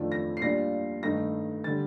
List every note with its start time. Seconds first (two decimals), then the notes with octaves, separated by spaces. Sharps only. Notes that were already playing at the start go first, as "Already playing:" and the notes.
Already playing: F2 D#3 A3 D4 F4
0.12 A#6
0.37 C7
0.42 A#2 G3 D4 F4 A#6
1.03 G2 D#3 A3 D#4 A#6
1.64 D3 G3 A6